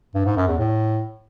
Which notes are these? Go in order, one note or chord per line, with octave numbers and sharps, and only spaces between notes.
G2
G#2
F#2
E2
A2